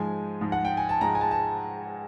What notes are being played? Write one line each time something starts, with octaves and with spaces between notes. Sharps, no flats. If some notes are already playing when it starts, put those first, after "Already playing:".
Already playing: G#2 F3 G#3 G#5
G#2 F3 G#3
F#5
G5
G#5
A5
G#2 F3 G#3 A#5
G#5
A5
A5